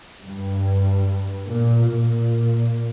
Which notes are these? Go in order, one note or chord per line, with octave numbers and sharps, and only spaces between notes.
G2
A#2
A#2